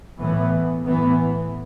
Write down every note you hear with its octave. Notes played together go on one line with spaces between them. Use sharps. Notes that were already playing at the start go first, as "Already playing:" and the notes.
A2 E3 B3
A2 E3 B3